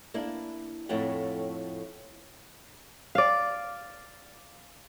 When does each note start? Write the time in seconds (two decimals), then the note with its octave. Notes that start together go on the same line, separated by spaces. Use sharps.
0.14 A#3 D4 E4
0.89 F2 A2 A3 C#5 F#5 G5
3.15 D5 F5